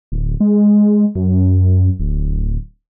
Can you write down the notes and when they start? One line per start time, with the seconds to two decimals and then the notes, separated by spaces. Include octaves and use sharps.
0.12 D1
0.40 G#3
1.15 F#2
2.00 D1